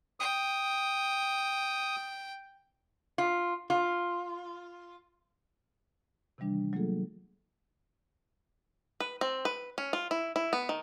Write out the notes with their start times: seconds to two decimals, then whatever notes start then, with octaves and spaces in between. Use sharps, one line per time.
0.20 G5 D#6
3.18 F4
3.70 F4
6.38 C3 D#3 E3 G3 D4
6.73 F#3 A3 A#3 F4 G#4 A4
9.00 B4
9.21 C4
9.45 B4
9.78 C#4
9.93 F4
10.11 E4
10.36 E4
10.53 B3
10.69 D#3